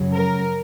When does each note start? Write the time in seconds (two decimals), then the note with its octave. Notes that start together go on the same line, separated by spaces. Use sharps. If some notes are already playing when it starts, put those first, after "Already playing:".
Already playing: F#2 C#3 F#3
0.12 A#4